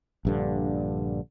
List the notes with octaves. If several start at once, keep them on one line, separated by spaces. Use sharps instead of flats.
A#1 G2 D3